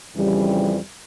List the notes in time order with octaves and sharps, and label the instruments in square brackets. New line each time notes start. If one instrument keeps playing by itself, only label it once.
[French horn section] F2 C#3 E3 G3